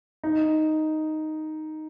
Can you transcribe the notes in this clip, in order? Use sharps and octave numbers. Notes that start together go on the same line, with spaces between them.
D#4